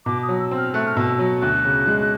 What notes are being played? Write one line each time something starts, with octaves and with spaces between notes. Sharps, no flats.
B2 D6
D#6
F#3
E6
C4
F6
A3 F#6
F6
B2 E6
F#3
D2 F#6
C#3
G#3